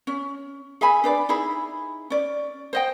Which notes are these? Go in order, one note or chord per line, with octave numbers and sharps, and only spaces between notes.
C#4
G#4 E5 G#5 B5
D4 B4 D5
D#4 E4 G#4 B5
C#4 D5
C5 D#5 G5